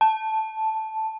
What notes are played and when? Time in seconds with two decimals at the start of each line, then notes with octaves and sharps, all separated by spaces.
0.01 A5